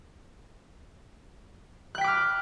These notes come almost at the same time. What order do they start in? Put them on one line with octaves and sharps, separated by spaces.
F#6 G5 B6 D6 F6